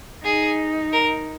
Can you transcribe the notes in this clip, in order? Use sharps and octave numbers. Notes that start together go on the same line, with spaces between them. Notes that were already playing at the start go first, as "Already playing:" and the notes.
D#4 G#4
A#4